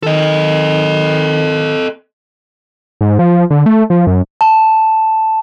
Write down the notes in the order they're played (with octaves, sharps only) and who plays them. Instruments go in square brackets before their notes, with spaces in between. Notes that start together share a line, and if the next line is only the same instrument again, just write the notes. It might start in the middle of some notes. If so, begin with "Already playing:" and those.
[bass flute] D#3 [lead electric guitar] A4 D#5
[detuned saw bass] G#2
F3
D3
A3
F3
F#2
[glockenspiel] A5